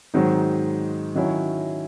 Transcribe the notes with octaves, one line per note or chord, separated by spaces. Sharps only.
G#2 D#3 F#3 C4 D#4
D#3 F#3 C#4 E4